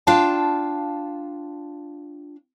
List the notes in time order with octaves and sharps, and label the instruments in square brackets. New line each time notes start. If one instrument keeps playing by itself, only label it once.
[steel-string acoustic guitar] D4 F4 F5 G5 A5